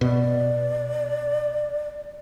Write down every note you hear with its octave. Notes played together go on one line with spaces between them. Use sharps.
B2 D5